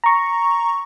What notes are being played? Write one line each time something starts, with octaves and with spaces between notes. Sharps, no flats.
A#5 C#6